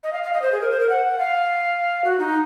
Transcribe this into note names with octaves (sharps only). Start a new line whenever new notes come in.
D#5
F5
F5
D#5
C5
G#4
A#4
C5
A#4
F#5
F5
F#4
D#4